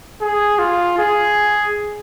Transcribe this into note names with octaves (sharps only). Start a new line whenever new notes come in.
G#4
F4
G#4